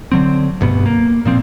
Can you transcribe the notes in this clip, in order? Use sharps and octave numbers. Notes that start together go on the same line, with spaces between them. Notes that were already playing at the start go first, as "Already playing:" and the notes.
D3 F#3 C4
D2 G2 B2 B3
A#3
A#2 F3 C4